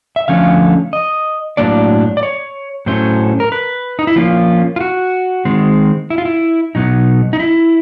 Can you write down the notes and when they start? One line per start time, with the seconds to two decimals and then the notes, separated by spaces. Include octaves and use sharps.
0.16 E5
0.28 D3 F3 A3 C#4 F5
0.93 D#5
1.57 A2 F#3 A#3 D4 D5
2.17 D5
2.23 C#5
2.86 A2 F#3 A3 C#4 C5
3.40 A#4
3.52 B4
3.99 D#4
4.07 E4
4.16 F3 A#3 C#4 F4
4.76 F4
4.81 F#4
5.45 D#3 G#3 C4
6.10 E4
6.18 F4
6.25 E4
6.75 B2 F#3 B3 D#4
7.33 D#4
7.40 E4